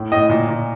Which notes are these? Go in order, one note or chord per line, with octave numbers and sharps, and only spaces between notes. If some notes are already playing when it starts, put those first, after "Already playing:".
Already playing: A2
A2 D#5
A#2
A#2